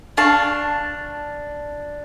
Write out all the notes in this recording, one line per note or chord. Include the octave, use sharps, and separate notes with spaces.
D4 F5 A5 C#6